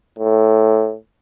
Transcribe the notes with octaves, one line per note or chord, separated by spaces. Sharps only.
A2